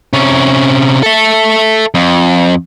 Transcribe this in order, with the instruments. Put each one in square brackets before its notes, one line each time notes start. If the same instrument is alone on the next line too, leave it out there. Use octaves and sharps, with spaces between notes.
[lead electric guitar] C3 C#4
A4 E5
F2